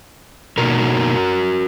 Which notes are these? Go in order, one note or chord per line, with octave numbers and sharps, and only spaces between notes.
B2 A#3 D#4 F#4 A#4